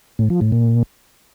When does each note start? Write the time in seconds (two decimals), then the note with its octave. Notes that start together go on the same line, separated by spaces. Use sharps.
0.19 A2
0.30 F3
0.41 A2
0.52 A#2